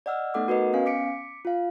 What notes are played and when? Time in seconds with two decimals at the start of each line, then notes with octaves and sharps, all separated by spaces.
0.06 D5 D#5 F#5 E6 F6
0.34 A3 B3 D#4 A4 F#5 D6
0.48 F#4 A#4 B4 D#5
0.73 B3 C#4 F5 G#5
0.86 D6 B6 C#7 D7
1.45 F4 F5